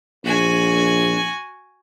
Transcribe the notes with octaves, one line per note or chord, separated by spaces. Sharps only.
A#1 F#4 G#5